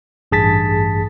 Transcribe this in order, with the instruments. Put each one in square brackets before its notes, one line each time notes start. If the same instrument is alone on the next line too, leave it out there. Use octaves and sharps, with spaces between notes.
[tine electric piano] A1 G2 G#4 A5 A6 B6